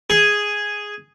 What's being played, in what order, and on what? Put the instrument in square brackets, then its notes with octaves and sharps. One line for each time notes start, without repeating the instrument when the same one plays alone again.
[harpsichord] G#4